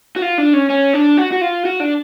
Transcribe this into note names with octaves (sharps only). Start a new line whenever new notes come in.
F#4
F4
D4
C#4
C#4
D4
F#4
F#4
F4
F#4
D4